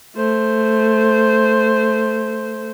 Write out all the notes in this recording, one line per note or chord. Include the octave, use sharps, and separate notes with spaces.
A3 C5